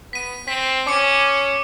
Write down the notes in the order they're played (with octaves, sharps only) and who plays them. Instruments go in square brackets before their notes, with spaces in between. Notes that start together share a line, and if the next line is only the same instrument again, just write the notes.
[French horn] B3 [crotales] B6 D#7
[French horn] C4 [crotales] B6
[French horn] C#4 [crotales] D6 C#7